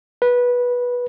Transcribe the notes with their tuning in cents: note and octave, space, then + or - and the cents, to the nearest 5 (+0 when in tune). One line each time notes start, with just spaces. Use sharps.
B4 -15